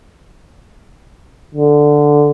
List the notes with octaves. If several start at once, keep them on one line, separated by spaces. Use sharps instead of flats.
D3